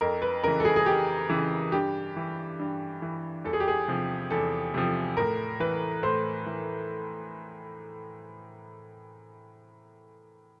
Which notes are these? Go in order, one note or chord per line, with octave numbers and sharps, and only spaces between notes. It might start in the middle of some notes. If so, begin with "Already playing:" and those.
F2 A#4
B4
C#3 E3 A#4
A4
G#4
G#4
F2 G4
C#3 E3
G2 G4
E3
G2
E3
E2 A4
G#4
G4
G#4
C3 F3
E2 A4
C3 F3
A2 A#4
E3 B4
A2 C5
E3